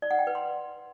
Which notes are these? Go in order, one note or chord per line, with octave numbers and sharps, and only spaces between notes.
D5
F#5
G5
B4
C6